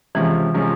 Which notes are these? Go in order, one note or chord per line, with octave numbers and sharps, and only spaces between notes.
C#2 C3 E3 F3 G#3 C#4
C3 F3 G#3 C#4